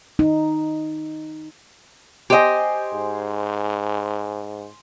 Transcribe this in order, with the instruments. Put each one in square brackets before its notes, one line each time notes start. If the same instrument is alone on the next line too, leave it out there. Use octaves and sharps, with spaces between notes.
[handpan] D#4
[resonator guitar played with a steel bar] G4 D#5 [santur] C5 G#5
[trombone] G#2